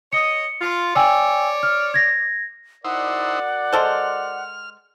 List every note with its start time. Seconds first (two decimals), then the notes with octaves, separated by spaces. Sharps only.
0.13 C#5 D#5 C#7
0.61 F4
0.96 C#5 D5 G5 G#5 E6
1.63 F6
1.94 G#6 A#6
2.84 D#4 E4 F#4 A#4 C5 D5 F#5
3.72 G#3 A4 C5 F6